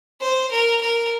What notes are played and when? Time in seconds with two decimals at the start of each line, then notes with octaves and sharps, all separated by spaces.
0.21 C5
0.52 A#4
0.81 A#4